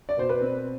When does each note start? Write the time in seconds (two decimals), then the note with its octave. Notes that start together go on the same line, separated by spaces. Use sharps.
0.09 D5
0.17 B2 C5
0.29 B4
0.41 C4